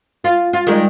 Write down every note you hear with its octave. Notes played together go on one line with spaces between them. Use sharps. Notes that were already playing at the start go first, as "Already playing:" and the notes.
F4
F4
D#3 G3 G#3